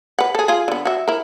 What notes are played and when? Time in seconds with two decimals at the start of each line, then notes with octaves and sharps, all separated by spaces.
0.19 B4 F#5
0.35 G#4 A4
0.48 F4 G#4
0.68 D3 B3
0.85 F#4 E5
1.08 E4 A#4